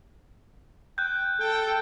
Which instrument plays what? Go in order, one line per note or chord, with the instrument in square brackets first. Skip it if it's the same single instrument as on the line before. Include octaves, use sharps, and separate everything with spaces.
[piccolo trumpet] G5 [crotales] F#6 G6
[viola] A4 [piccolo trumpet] G5